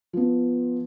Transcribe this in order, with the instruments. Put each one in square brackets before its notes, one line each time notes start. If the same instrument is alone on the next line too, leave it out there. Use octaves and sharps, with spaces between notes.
[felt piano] F3 B3